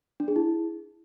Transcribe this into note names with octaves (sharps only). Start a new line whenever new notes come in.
D4
G#4
E4